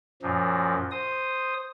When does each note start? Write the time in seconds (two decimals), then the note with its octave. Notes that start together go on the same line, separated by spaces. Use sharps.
0.22 F#2 A#2 F3
0.91 C5 D#6